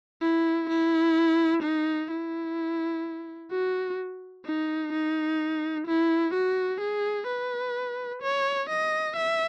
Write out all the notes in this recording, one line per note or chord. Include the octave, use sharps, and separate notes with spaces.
E4
E4
D#4
E4
F#4
D#4
D#4
E4
F#4
G#4
B4
C#5
D#5
E5